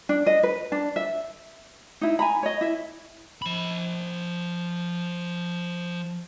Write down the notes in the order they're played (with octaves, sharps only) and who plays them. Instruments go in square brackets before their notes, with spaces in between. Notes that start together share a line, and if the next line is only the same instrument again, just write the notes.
[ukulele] D4
D#5
B4
D4
E5
D#4 E4
G#5 A#5 B5
C#5 D#5
E4 E5
[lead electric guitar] F3 B5